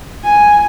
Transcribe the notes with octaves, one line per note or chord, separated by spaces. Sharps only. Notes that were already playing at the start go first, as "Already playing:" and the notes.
G#5